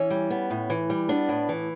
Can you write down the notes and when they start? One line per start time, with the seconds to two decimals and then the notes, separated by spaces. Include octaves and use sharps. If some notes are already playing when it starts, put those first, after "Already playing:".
Already playing: E3 C#4
0.10 G3
0.30 B3
0.50 A2
0.70 E3
0.90 G3
1.09 B3 D4
1.29 A2
1.49 E3